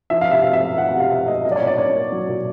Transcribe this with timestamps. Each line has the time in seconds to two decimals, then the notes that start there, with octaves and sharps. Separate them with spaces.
0.10 F3 E5
0.21 F5
0.27 C3 E5
0.42 C4 F5
0.53 E5
0.60 A3
0.78 F3 F#5
0.89 F#5
0.94 C3
1.00 F5
1.11 C4 E5
1.28 A3 D#5
1.45 F#3 D#5
1.52 D5
1.56 C#5
1.61 A#2
1.67 D5
1.78 C#4 C#5
1.95 A#3
2.12 F#3
2.29 A#2